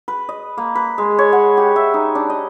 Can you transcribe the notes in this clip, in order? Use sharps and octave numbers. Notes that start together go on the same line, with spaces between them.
B4
D#5
A#3
B4
G#3
C#5
F#5
G4
E5
D#4
D4
D#5